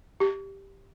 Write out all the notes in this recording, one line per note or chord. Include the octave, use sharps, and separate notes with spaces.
G4